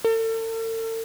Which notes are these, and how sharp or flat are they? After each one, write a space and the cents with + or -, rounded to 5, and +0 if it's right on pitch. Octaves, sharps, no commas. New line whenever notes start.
A4 +40